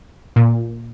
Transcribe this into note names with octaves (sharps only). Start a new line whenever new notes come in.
A#2